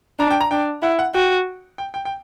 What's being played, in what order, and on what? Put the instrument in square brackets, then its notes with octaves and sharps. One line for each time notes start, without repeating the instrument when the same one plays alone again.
[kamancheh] D4 [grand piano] A#5
[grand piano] G5
A#5
[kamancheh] D4 [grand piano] G5
[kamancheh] E4 [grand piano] F#5
[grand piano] F#5
[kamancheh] F#4 [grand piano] G5
[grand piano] G5
G5
G5